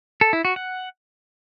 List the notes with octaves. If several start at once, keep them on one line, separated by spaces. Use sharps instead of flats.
A4
E4
F#4
F#5